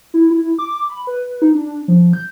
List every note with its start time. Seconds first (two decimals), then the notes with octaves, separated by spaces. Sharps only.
0.14 E4
0.31 E4
0.59 D6
0.90 B5
1.07 B4
1.42 D#4
1.55 D4
1.88 F3
2.13 G6